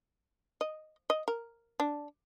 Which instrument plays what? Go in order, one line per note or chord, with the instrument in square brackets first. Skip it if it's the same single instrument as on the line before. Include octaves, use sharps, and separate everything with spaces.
[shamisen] D#5
D#5
A#4
D4